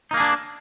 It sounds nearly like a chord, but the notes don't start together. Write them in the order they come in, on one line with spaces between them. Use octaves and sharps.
D#4 A#3 G#4 D4